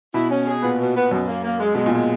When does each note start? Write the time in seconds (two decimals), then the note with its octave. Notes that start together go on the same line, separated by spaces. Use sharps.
0.14 B2 E4
0.30 C#4
0.47 G#4
0.62 A#2 B3
0.79 B2
0.95 B3
1.11 F#2 B2
1.28 A#3
1.44 A#3
1.60 G#3
1.74 B2 G#3
1.86 A#2
1.93 G#3